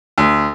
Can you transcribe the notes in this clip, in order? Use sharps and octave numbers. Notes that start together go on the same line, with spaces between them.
D2